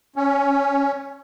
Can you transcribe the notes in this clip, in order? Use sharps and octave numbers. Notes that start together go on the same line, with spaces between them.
C#4